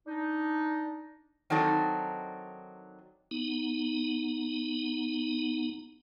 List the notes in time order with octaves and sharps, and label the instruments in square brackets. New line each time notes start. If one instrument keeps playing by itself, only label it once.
[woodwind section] D4 D#4
[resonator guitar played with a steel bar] D#3 F#3 C4 D4 D#4 A4
[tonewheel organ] B3 D#4